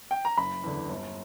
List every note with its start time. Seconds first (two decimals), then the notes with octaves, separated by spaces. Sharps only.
0.11 G5
0.25 A#5
0.37 F#1 B5
0.64 E2 D3
0.89 G1